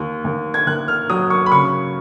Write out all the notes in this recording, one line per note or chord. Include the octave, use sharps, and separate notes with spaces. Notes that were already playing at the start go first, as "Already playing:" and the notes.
Already playing: D#2
D#2
G#6
D#2 F#6
F6
F#3 D#6
C#6
B5
C#3 C#6